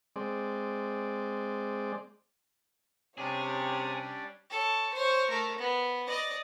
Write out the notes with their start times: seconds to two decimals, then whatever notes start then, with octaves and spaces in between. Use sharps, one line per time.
0.16 G#3 C4 D5
3.18 C3 G3 C#4 D4 G#4 C#5
4.50 A4 C#5
4.94 C5 C#5
5.30 A3 A#4
5.59 B3
6.08 D5 D#5